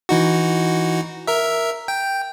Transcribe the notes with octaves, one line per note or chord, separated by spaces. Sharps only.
E3 D#4 F#4
A#4 E5
G5